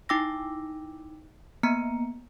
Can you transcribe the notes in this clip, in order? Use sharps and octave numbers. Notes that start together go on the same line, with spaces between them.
D#4 E4 G5 D6 E6 A#6
A#3 B3 A#5 C#7